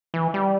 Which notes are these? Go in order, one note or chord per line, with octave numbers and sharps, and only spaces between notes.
E3
G3